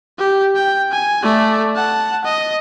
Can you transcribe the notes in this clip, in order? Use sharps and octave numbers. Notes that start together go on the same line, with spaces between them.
G4
G5
G#5
A3 D5
F#5 A5
D#5